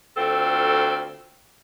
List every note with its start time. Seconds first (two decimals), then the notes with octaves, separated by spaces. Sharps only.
0.17 D2 C4 F4 A4